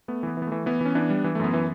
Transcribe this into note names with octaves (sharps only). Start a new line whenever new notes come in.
A3 B3
E3 B3
E3
B3
E3 A3
E3 B3
E3 C#4
E3 B3 D4
G3
E3
A3
F#2 B3
E3